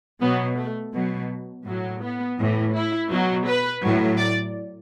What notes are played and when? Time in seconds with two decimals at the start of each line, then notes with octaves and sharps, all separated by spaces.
0.21 B2 F#3 B3
0.57 A3
0.94 B2 F#3
1.66 A2 F#3
2.02 B3
2.39 A2 E3
2.74 E4
3.10 B2 F#3
3.46 B4
3.83 A2 F#3
4.18 D5